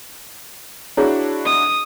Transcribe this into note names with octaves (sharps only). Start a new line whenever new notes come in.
D4 E4 F#4 G#4 C#5 A#5
D#5 D#6